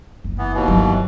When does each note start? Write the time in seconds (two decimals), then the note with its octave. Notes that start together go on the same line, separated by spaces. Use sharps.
0.24 F#1
0.38 E3 B3
0.54 D#2 B2 E3
0.68 G1 F#3